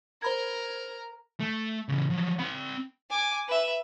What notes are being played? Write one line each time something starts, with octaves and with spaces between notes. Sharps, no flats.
A#4 C5 B5 G#6
A3
C#3 E3
F3 F#3
C4 B5
G#5 D6
B4 E5